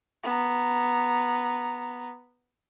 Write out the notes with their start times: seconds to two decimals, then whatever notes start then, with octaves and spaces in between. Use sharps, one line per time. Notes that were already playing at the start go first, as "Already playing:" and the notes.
0.24 B3 A#5